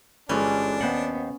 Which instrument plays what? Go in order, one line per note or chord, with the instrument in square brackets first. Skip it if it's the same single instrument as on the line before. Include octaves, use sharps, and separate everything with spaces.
[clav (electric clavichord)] G1 E3 G3 [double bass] G#3 [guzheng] C#4 [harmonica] D4
[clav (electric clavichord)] D#2 C5 F#5 [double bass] B3